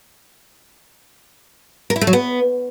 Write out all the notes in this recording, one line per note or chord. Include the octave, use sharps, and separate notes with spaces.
A#4
E4
A3
F#3
B3